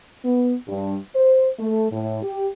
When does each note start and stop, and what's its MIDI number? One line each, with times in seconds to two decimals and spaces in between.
0.24 0.54 59
0.67 0.97 43
1.15 1.48 72
1.58 1.87 57
1.91 2.21 45
2.23 2.48 67